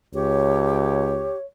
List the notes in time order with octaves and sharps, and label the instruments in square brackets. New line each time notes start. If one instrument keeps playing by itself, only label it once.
[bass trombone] C#2 [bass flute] G4 [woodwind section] C#5